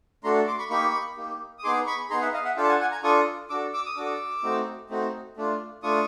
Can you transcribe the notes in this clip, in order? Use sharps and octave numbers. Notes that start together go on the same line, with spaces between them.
A3 D4 F#4 A4 A#5 C6
C6 D6
B5 C#6
A#3 D#4 G4 B5 C#6
A#3 D#4 G4
D#6
B3 D#4 G#4 C6 D6
B5 C#6
B3 D#4 G#4 A#5 C6
E5 F#5
D#5 F5
E5 F#5
D4 F4 A4 F5 G5
A5
F#5 G#5
F#5 G#5
G#5 A#5
D4 F4 A4 C#6 D#6
D4 F#4 A4 D6 E6
D6 E6
D#6
D4 F#4 A4 D6 E6
A3 C4 D#4 F#4
A3 C4 D#4 F#4
A3 D4 F4
A3 D4 F4 C#6 D#6